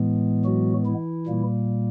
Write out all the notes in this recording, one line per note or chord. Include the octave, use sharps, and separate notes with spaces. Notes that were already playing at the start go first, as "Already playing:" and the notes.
Already playing: A2 E3 G#3 B3
F#3 F#4
E3 E4
A#2 G3 A#3